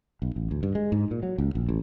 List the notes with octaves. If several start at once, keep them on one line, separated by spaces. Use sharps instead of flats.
B1
A1
D2
G2
G#3
G#2
A#2
F#3
C#2
A#1
A1